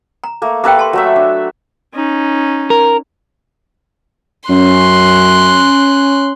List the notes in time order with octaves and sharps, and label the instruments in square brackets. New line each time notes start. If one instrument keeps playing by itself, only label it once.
[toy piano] A#5
[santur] A3 A#3
[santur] A#3 A4 B4 [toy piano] G4 G5
[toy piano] G4 A5 C6
[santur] F#3 A3 E5
D4
[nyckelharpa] C#4 D#4
[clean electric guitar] A#4
[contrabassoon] F#2 [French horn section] C#4 [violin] C6 F#6